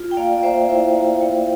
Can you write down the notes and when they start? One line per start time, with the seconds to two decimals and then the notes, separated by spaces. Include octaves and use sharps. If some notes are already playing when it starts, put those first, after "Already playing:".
Already playing: F4
0.11 G5
0.17 A#3 D5 F5
0.38 D5
0.43 A#3 C5 E5
0.69 E4 C5 E5
0.95 A#3
1.21 A#3